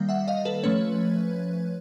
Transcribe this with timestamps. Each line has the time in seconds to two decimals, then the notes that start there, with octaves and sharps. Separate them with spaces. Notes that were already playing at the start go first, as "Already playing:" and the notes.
Already playing: D#3 G3 A#3
0.09 E5 F#5
0.28 D#5 F5
0.45 A4 B4
0.63 F3 A3 C#4 B4 C#5